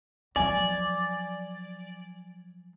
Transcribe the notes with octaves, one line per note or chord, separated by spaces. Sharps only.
F3 F#3 D5 G#5